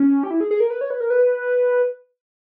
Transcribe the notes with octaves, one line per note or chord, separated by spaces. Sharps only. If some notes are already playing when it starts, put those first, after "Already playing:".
Already playing: C#4
G4
E4
G#4
G#4
A#4
B4
C#5
B4
A#4
B4